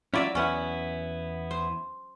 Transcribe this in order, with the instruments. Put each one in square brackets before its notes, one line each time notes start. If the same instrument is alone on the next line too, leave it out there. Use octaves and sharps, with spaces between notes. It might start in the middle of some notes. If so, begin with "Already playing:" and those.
[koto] F#3 D5 E5 [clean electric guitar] C#4 E4 F4
[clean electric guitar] E2 B3 E4 [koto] C#4 F#5
[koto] C5